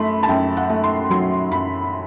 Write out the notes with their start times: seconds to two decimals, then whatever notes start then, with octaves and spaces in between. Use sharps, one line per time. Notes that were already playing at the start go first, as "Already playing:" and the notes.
Already playing: F#2 A3 B5 C6
0.23 A5
0.29 F#2 G5
0.57 F#5
0.70 A3
0.84 C6
1.10 F#3 C6
1.52 F#2 B5